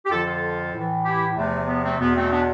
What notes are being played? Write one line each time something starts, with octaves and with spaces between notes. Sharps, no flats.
G4
F2 D3 F3 F4 A4
F4 A4
A2
E3
E4 G4
E2 C3 F3 A3
B3
A3 C4
E2 B2 B3
A3 C4
B3 D4